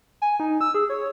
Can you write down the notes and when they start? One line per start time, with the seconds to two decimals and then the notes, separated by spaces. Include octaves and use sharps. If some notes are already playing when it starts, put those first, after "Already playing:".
0.22 G#5
0.40 D#4
0.61 E6
0.75 G#4
0.89 C#5